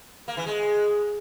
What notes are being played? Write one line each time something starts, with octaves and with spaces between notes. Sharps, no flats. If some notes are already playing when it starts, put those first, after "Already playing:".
A#3
E3
G#3